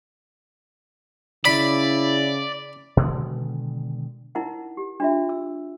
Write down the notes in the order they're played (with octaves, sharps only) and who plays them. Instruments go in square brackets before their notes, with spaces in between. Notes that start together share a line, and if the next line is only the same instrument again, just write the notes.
[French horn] C#3 [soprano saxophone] E4 [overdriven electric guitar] D5 [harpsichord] B5
[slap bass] B2 D3 D#3 G#3
[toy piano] D#4 E4 A#4 F#5
G4
D4 F4 E5
E6